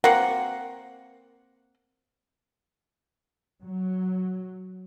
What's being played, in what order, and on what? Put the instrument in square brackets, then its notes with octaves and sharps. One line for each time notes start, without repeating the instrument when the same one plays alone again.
[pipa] A#3 C4 [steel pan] F#5
[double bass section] F#3